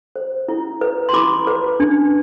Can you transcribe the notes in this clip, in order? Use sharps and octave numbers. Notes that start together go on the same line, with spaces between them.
C5
E4
B4
C6
E4 B5 D6
B4
D4